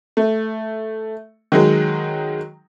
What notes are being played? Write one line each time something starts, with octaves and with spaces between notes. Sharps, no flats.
A3
D#3 F#3 G#3